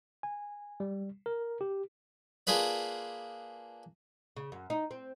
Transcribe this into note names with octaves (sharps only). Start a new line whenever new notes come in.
G#5
G3
A#4
G4
A#3 D4 F4 G#4 B4 D5
C#3
F#2
D#4
C4